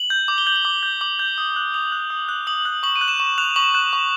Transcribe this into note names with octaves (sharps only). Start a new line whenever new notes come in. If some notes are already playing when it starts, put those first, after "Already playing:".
Already playing: F#7
G6
D6
G7
G6 F#7
G7
D6
G6
D6 F#7
G6
D#6
F#6
D#6 F7
F#6
D#6
F#6
D#6 F#7
F#6
C#6 F#7
D#7
F#6
E7
C#6 E7
F#6 F7
C#6 F#7
F#6
C#6